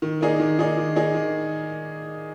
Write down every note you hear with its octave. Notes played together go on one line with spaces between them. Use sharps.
D#3
A#3 D#4 G#4 D5
D#3
A#3 D#4 G#4 D5
D#3
A#3 D#4 G#4 D5
D#3